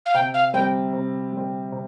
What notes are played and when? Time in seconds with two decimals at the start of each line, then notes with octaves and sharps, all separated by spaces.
0.06 F5
0.14 C3 G5
0.34 F5
0.54 G3 C4 G5
0.93 C3
1.32 G3 C4
1.72 C3